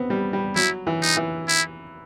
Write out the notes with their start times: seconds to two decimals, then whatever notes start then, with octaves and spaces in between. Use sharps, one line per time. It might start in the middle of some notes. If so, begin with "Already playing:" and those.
Already playing: B3 C4
0.10 G3
0.33 G3
0.56 F#3 E4
0.87 E3
1.02 D#4
1.17 E3
1.48 E4